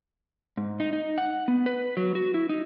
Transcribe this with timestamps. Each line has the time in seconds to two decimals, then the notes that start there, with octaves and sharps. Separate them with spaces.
0.57 G#2
0.80 D#4
0.93 D#4
1.18 F#5
1.48 B3
1.66 B4
1.97 F#3
2.15 F#4
2.34 E4
2.49 D#4